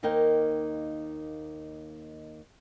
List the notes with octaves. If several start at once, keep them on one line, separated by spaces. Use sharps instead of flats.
D#2 A#3 D#4 A#4 C5 G5